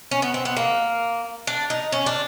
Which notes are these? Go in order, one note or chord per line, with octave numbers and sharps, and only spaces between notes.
C#4
B3
C4
B3
A#3
D4
D#4
C#4
D4